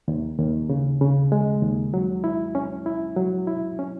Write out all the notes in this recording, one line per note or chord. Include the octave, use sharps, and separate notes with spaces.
D#2
D#2
C#3
C#3
G#3
D#2
F#3
E4
C#4
E4
F#3
E4
C#4